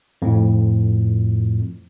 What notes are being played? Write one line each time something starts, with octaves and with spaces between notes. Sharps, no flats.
F2 A2